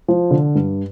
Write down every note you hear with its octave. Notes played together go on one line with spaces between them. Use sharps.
F3
D3
G2